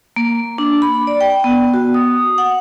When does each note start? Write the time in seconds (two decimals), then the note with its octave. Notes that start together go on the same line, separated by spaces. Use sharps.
0.16 A#3
0.58 D4
0.82 B5
1.07 D5
1.21 G5
1.44 B3
1.74 F#4
1.94 D#6
2.38 F#5